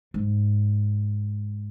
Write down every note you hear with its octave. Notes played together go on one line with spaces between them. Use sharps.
G#2